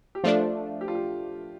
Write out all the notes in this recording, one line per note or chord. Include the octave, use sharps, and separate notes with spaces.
G4
F3 A3 D4 F4
G4
F4
G4